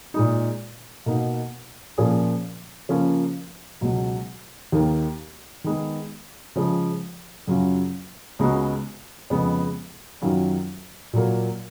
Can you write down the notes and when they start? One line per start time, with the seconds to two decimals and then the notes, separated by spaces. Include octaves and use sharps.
0.14 A#2 G#3 D#4
1.06 B2 A#3 D#4
1.98 A#2 F3 A#3 C#4 G#4
2.89 C#3 F3 A#3 C#4 F4
3.81 C#2 B2 F#3
4.72 D#2 D#3 A#3
5.64 D#3 G#3 B3
6.55 C#3 F3 G#3
7.47 F#2 C#3 F#3 C#4 F4
8.39 C#2 C#3 G#3 B3 F#4
9.30 F2 C#3 G#3 B3
10.22 F#2 D#3 F#3 C#4 F4
11.13 A#2 F#3 A#3